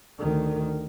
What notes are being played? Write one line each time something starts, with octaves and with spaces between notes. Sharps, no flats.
D2 D#3